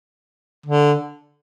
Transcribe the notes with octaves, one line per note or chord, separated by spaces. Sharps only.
D3